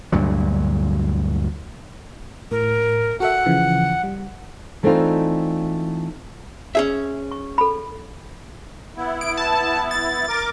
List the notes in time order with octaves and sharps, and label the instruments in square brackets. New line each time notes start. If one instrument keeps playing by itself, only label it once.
[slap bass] D2 G2 A#2 F#3
[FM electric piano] A2 [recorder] A#4
[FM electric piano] F#4 A4 E5 [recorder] F#5
[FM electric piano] C#3 E3 F3
G3
[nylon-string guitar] E3 A3 C4 D4 D#4 F4
[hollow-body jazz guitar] C#4 G#4 E5
[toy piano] C#6
A4 B5
[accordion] B3 E4
[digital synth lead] D7
A5
A6
[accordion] A#4 D6